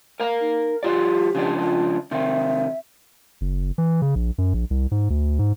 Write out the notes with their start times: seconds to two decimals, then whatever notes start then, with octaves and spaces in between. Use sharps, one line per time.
0.20 A#4 F5 A#5
0.40 D#4
0.83 F#3 F4 G4 D5
1.35 C#3 F3 D4
1.62 F4
2.11 C3 D#3 E5
3.41 F#1
3.78 E3
4.02 C#3
4.15 A#1
4.38 F#2
4.54 A#1
4.71 C2
4.91 G#2
5.10 D2
5.39 G#2